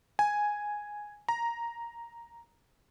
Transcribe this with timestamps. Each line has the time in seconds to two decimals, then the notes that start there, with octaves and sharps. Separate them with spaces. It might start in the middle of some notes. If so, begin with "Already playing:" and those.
0.19 G#5
1.29 A#5